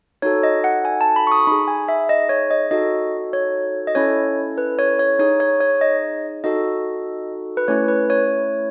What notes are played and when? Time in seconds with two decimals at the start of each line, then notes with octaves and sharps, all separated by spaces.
0.22 D#4 F#4 A4 C#5
0.43 D#5
0.64 F#5
0.85 G#5
1.01 A5
1.16 B5
1.27 C#6
1.32 D#6
1.47 D#4 G#4 B5
1.68 G#5
1.88 E5
2.09 D#5
2.29 C#5
2.51 D#5
2.71 D#4 F#4 A4 D#5
3.33 C#5
3.87 D#5
3.95 C#4 E4 A4 C#5
4.58 B4
4.79 C#5
4.99 C#5
5.19 D#4 G#4 C#5
5.40 C#5
5.61 C#5
5.81 D#5
6.44 D#4 F#4 A4 D#5
7.57 B4
7.68 A3 C#4 E4 C#5
7.88 B4
8.10 C#5